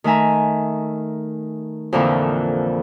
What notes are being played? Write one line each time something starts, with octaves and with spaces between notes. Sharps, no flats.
D#3 A3 E5 G#5 A#5
F2 A#2 D3 E3 F3